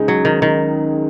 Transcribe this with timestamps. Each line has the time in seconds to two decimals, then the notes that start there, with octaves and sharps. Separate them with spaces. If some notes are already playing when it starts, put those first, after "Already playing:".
Already playing: C#2 C#3 G#3 D#4 G#4
0.08 F#3
0.25 D#3
0.42 D#3